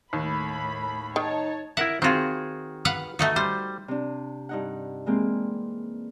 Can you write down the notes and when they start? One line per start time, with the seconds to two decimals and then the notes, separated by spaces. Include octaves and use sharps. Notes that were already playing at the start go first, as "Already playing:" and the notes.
0.13 D#2 A2 B5
1.16 D#3 D#4 C#5 A5
1.77 E4 A#4 E5 F#5
2.02 D#3 C4 F4 F#4 G#4
2.85 B4 F5 F#5
3.19 A3 D#4 F#4
3.36 G3 C5
3.88 C3 D4
4.49 G2 D#4 F#5
5.06 E3 G#3 A#3 C4